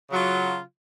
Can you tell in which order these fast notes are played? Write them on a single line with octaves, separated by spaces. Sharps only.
C#3 F#3 F4